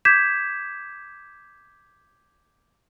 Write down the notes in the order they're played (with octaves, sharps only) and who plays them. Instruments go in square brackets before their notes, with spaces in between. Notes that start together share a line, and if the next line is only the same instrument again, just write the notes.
[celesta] D6 G6 G#6 B6 E7